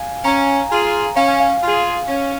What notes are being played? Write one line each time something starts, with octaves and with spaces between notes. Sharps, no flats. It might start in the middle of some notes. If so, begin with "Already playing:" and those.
Already playing: F5 G#5
C#4 A#5
F4 G#4 G#5
C#4 F5
G#5
F5
F4 G#4
C#4